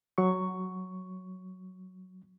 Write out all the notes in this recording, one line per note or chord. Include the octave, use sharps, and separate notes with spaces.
F#3 C#6